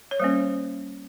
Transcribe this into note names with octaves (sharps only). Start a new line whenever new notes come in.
C#5
G3 A#3 C#4 C5